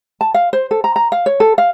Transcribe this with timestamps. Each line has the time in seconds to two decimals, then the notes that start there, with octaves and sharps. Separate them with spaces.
0.21 A5
0.34 F5
0.53 C5
0.71 A4
0.84 A#5
0.96 A#5
1.12 F5
1.26 C#5
1.40 A4
1.58 F5